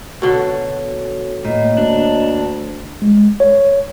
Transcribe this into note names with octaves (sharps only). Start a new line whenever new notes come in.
B2 D3 F#4 A4 C#5
A2 A#3 C#5 D#5
D2 D4
G#3
C#5